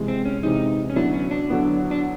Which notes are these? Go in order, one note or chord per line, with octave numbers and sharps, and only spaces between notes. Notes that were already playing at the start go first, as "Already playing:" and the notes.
Already playing: C3 E3 G#3
C4
C#4
C3 E3 G#3 D#4
C#4
D3 F#3 B3 D4 E4
C#4
D4
D3 F#3 B3 E4
D4